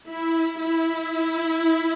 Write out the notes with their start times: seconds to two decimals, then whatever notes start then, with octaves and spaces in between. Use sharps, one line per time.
0.09 E4
0.59 E4